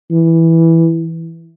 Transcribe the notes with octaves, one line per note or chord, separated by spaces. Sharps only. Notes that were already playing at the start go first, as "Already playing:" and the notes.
E3